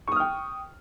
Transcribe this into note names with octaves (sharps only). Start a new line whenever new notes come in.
G5 C#6 D#6 F6